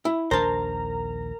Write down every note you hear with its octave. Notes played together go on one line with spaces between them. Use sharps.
E4
A#1 D#2 D4 A#4 C5 A5 A#5